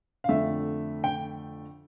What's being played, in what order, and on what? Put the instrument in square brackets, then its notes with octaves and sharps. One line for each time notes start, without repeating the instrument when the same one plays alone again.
[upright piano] F5
F2 D3 A3 E5
G5